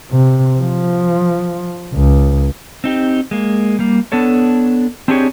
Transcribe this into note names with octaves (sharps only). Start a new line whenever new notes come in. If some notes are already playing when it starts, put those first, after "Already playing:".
C3
F3
C#2
C4 D#4 G4
G#3 A#3
G3 A#3
B3 D4 A4 C#5
C4 D4 D#4 G4 G#4 C#5